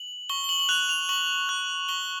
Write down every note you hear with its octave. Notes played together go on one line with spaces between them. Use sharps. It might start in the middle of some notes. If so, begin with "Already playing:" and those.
Already playing: F#7
C#6 G7
G7
F#7
F#7
F#6 F7
F7
C#6 F#7
F#6
C#6 G7